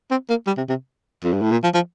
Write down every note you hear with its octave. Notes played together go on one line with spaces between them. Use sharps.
C4
A#3
G3
C3
C3
F2
G2
A2
A#2
F3
F3